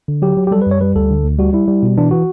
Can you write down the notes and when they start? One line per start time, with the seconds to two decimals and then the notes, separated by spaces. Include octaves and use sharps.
0.08 D3
0.22 F#3 G4
0.37 F#3
0.47 G4
0.51 G3 A4
0.62 B4
0.66 F#2 C#5
0.81 G3 B4
0.95 D2 A4
1.10 D3
1.24 D2
1.39 G3 F#4
1.53 G3 E4
1.68 G3
1.83 B2
1.98 E3 D4
2.11 E3 F#4